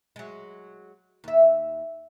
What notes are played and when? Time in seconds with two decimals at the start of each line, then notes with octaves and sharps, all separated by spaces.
0.16 F#3 G#3
1.24 D#2 E5